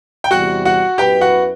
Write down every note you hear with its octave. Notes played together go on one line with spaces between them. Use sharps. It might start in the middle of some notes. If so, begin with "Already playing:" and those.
G5
E2 C3 G3 F#4 F#5
F#4 F#5
F#2 F#3 B3 E4 G4 B4 G5
F#4 F#5